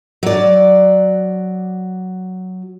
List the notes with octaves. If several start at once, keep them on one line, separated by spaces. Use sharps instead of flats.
F#3 D5